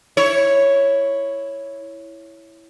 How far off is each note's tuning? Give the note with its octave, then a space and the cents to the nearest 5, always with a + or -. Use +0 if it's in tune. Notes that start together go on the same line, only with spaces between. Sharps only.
E4 +0 C#5 +0